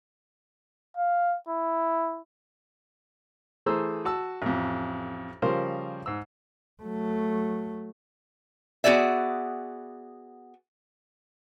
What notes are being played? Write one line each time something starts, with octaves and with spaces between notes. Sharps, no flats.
F5
E4
E3 A3 G#4 C5 A#5 E6
F#4 A5 E6
A1 F2
C#3 F3 G3 A#4 C5
G#2 E6
F#3 A3
B3 F#4 G#4 D5 E5